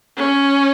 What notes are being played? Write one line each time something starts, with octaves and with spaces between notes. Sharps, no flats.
C#4